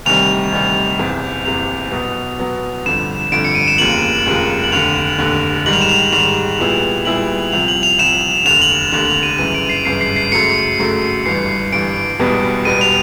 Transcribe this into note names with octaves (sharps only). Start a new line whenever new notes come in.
D2 C3 D#3 G3 F7
D2 C3 D#3 G3
F#1 E2 C3
F#1 E2 C3 F7
B2 F#3 B3
B2 F#3 B3
G1 F2 D3 E7
G1 F2 D3 D7
C#7
D#7
E7
F1 D#2 C#3 F3 A#3 F#7
F1 D#2 C#3 F3 A#3
F#7
F1 D#2 D3 F7
F1 D#2 D3
G#2 D#3 G3 F#7
F7
E7
F7
G#2 D#3 G3 F7
A#2 G3 B3 E4 G#4
A#2 G3 B3 E4 G#4 F#7
C2 C3 F3 F7
F#7
F7
C2 C3 F3 E7
F1 D#2 D3 F7
F#7
F1 D#2 D3 F7
F7
D#7
G1 F#2 C#3 E3 D#7
D7
C7
G1 F#2 C#3 E3 C7
C7
C7
F#2 C#3 F#3 A3 C#7
F#2 C#3 F#3 A3
G1 G2 E3 C7
G1 G2 E3 D7
E1 E2 B2 G3 B3
E1 E2 B2 G3 B3 D#7
F7